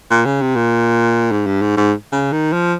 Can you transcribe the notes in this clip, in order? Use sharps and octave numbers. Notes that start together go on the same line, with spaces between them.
A#2
C#3
C3
A#2
G#2
G2
G#2
G#2
C#3
D#3
F3